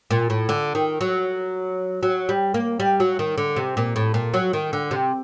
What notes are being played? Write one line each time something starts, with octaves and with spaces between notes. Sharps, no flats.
A#2
A2
D3
D#3
F#3
F#3
G3
A#3
G3
F#3
D#3
D3
C3
A#2
A2
A#2
F#3
D#3
D3
C3